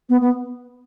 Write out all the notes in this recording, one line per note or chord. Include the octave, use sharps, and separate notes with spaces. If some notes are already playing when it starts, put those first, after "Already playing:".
B3
B3